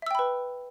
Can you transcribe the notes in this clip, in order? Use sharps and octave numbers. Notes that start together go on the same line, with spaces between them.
B4 E5 G5 B5 E6